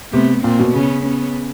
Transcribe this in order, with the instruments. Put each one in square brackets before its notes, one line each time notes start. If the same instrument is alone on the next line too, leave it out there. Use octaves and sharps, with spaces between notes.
[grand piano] C3 [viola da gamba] A3 B3
[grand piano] A#2 [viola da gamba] A#3 C4
[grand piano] B2
[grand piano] C#3 [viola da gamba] B3 C#4
[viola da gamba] B3 C#4